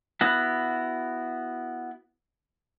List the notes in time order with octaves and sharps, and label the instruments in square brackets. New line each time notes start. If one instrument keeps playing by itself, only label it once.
[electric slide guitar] B3 E4 F#4